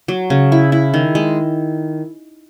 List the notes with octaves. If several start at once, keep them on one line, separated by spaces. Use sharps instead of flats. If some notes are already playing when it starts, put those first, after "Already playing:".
F#3
C#3
E4
E4
D#3
G#3